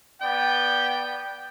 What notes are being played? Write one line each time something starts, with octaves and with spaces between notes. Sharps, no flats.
B3 D5 G5